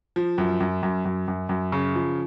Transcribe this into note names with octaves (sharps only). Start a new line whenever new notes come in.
F3
F#2
F#2
F#2
F#2
F#2
F#2
C#3
F3